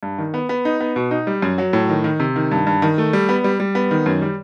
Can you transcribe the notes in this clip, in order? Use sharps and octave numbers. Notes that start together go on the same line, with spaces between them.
G2
D#3
B3
B3
D#4
B3
B2
D#4
G3
F#2
F#3
A2
D#3
D#3
C3
D#3
G2
G2
D#3
A3
G3
B3
G3
G3
B3
D#3
F#2
G3